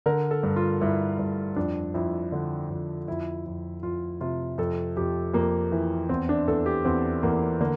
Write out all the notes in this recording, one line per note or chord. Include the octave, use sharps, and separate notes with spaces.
D3 A#4
A4
G2
F4
G2 E4
G2
F2 D4
F2 E4
D3
F2
F2 E4
F2
F2 F4
C3 F4
F2 A4
F2 G4
F2 A#3
E3
E2 C4
D4
E2 A4
G4
E2 C4
E2 A#3
D3 A#3